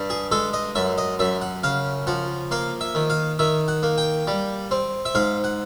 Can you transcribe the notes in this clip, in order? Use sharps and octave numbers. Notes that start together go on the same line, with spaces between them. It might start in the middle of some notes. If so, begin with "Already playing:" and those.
Already playing: G2
G#4
G#3 A4
D#5
F#2 E5
D#5
F#2 E5
F#5
C#3 F5
F3 F#5
A#3 F5
E5
D#3
F5
D#3 E5
F#5
A#3
G5
G3
C4
E5
G#2 F5
F#5